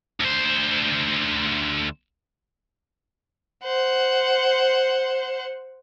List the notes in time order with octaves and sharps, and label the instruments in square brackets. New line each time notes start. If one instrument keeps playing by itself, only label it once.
[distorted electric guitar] D2 C5
[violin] C5 F#5